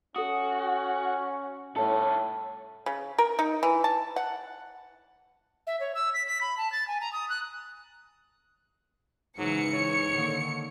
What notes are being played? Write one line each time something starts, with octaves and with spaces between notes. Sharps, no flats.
C#4 F#4 A4 D#6
C2 A2 A4 C#5 A5
C#3
A#4
D#4
E3
A5
F#5
E5
C#5
E6
B6
B6
B5
A5
A6
G#5
A#5
D#6
F#6
G#2 C#3 E3 F#3 C#7
C#5
D3 D#3 A#3